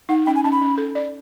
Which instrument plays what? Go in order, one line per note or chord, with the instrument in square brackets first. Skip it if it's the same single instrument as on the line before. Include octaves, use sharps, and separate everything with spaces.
[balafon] D#4 [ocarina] F#5
[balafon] C#4 [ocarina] G5
[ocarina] G#5
[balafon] C#4 [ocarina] A5
[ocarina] B5
[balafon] C#4
A4
D5